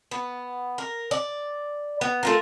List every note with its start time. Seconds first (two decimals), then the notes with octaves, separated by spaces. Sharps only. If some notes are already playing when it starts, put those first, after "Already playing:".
0.11 B3
0.78 A#4
1.11 D5
2.01 B3
2.23 A3 F4 A#4